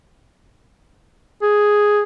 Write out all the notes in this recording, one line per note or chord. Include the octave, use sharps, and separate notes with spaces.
G#4